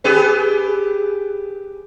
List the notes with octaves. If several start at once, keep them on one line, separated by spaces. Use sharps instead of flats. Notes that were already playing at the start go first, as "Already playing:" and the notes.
G4 G#4 B4